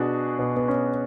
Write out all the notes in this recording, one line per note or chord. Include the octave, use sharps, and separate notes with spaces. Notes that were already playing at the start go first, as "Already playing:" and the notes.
Already playing: B2 D4 F#4 G#4
B2 B3
B3
C#4